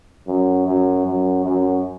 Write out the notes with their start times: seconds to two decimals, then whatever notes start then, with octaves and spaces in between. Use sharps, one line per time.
0.28 F#2
0.67 F#2
1.06 F#2
1.45 F#2